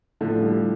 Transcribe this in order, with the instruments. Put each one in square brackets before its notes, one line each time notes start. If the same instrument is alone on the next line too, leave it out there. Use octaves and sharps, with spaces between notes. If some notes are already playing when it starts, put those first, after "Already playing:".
[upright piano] A2 [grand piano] D3 F3
[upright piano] G3